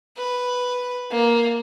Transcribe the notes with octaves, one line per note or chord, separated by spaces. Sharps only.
B4
A#3